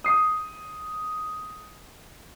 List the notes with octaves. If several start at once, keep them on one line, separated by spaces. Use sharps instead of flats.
D#6 C7